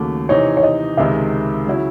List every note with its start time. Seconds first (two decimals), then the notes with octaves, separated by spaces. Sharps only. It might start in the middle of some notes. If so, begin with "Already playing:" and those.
Already playing: D#2 C#3 F#3 A3
0.29 C3 E3 C4 D#4 C#5
0.57 C#5
0.63 D#5
0.97 C#2 C3 D#3 G#3 E5
1.67 C#3 F#3 C#4 E4